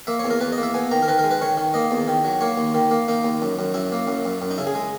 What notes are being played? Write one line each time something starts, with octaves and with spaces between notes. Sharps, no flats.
A#3 E5
C#5
E2
A#4
E2 B4
D#5
A#3
E5
B3 G#5
D#3 A#5
A#4
D#3 B4
A#4
G#3
B4
D#3 C#5
D#3
A#3 D#5
E2
D#3
F#3
A#3 C#5
D#2
D#3
A#3
A#3 D#4
D#2
F#2
F#2
F#2 E4
A#3
F#2
F#2
F#2
D#4
C#3 E4
G#4
G#3